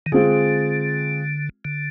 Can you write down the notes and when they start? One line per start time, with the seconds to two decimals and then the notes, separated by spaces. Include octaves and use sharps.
0.06 D#3
0.12 D3 G#3 C4 F4 G#4
1.65 D3